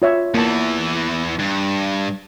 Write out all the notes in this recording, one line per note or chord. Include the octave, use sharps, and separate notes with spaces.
F4 C#5 E5
E2 E3 A#3 A5
G2